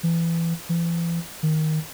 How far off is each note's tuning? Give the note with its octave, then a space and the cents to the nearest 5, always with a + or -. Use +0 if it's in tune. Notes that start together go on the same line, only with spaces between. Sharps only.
E3 +20
E3 +40
D#3 +5